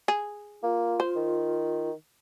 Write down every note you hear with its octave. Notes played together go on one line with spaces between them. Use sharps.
G#4
A#3 F4
C5
D#3